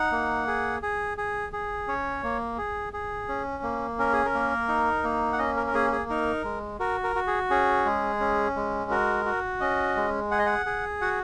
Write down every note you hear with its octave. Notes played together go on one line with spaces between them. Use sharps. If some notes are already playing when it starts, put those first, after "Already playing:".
Already playing: D#4 F#5
A#3
G#4
G#4
G#4
G#4
C#4 C#5
A#3
G#4
G#4
C#4
A#3
C#4 A#4
G#4
A#4
A#3
D#4
A#3
F#5
C#4 D#5
A#4
A#4
A#3 G#4
G#4
D#4 A#4
G#3
F#4 A#4
A#4
F#4
G#4
C#4 G#4
G#3
C#4
G#3
F#4 A#4
F#4
C#4 D#5
G#3
G#4 F#5
D#5
F#5
G#4
F#4 F#5